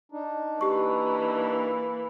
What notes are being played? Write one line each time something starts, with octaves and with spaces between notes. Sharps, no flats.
D4 D#4
E3 A#3 G4 C#6